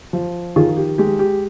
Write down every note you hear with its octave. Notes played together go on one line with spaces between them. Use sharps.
F3
D#3 F4 G#4
G4
G#3 G4
G4